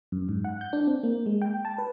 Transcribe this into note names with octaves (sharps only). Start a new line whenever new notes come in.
F#2
G#2
F#5
G6
D4
C4
A#3
G#3
G5
A5
B4